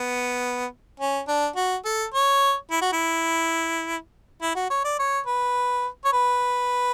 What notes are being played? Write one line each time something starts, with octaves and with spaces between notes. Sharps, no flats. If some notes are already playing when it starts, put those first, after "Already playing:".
Already playing: B3
C#4
D4
F#4
A4
C#5
E4
F#4
E4
E4
F#4
C#5
D5
C#5
B4
C#5
B4